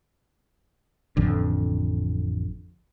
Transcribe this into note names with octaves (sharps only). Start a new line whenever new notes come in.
A1 F2 D3